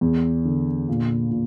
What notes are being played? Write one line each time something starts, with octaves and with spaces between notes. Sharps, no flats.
E2
D3
A#2
A#2